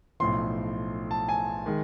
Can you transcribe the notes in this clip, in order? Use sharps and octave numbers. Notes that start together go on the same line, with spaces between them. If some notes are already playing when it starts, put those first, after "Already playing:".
B1 A2 F3 C6
A5
G#5
D#3 G#3